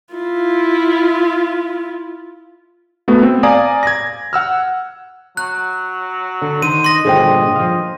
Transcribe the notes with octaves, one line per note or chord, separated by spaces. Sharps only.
E4 F4
A3 B3 F#4
C4
D5 F5 G#5 A#5 D6 D#6
G#6 A#6
F#5 E6 F6
F#3 F#6
D3
D#3 C5 D#7
D#5 C6 A#6
G2 A#2 D3 G#4 C5 G5
F3 F5